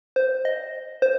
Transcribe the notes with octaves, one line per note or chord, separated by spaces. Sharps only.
C5
D#5
C5